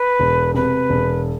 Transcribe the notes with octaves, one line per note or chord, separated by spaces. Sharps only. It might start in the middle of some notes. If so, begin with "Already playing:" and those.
Already playing: B4
E1
C3 B4
E1